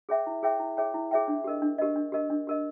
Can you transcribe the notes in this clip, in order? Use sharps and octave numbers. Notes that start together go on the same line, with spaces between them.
G#4 C#5 E5 G5
E4
G#4 C#5 E5 G5
E4
G#4 C#5 E5 G5
E4
G#4 C#5 E5 G5
D4
G4 A#4 D#5
D4
G4 A#4 D#5
D4
G4 A#4 D#5
D4
G4 A#4 D#5